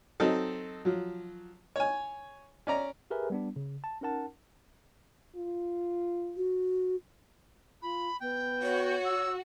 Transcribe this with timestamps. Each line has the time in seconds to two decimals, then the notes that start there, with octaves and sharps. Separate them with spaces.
0.20 F#3 C4 D#4 A4
0.85 F3 F#3
1.76 C#5 G#5
2.67 C#4 D5 A#5
3.11 G4 G#4 A#4 B4 E5 G#5
3.30 G3 B3 D4
3.56 C#3
3.84 A5
4.01 C#4 D#4 A#4 F#5 A5
5.36 F4
6.37 F#4
7.82 F4 B5
8.20 B3 G5
8.63 F#4 C#5
9.04 E6